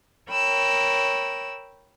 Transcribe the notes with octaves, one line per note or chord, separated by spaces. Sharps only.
A#4 C#5 G5 B5 E6